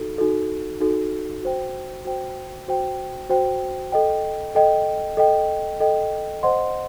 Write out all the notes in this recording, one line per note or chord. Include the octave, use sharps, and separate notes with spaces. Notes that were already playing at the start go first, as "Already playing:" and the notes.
Already playing: D#4 F#4 A4
D#4 F#4 A4
D#4 F#4 A4
F#4 C5 G5
F#4 C5 G5
F#4 C5 G5
F#4 C5 G5
A4 D#5 G5
A4 D#5 G5
A4 D#5 G5
A4 D#5 G5
C5 D#5 F#5 C6